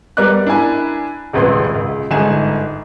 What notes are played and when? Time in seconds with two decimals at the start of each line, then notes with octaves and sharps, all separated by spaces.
0.17 G3 B3 A#4 D5 D6 F#6
0.46 D4 E4 A#4 G#5 B5
1.33 D#1 G#1 C#2 B4 C6
1.75 C#2
2.11 G1 G#2 D#4 G#5 E7